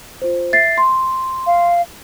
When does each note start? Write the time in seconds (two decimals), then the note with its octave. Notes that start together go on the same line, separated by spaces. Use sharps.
0.22 F4 C5
0.53 E5 A6 C7
0.78 C6
1.47 F5